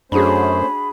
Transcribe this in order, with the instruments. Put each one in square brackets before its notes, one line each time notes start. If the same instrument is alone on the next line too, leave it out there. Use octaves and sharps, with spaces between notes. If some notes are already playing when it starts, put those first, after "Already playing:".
[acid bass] F#2 [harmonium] A3 C#4 C5 [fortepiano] D4 F#4 G#4 [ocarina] B5